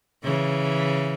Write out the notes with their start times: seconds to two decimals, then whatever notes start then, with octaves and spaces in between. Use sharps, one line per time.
0.24 C#3 E3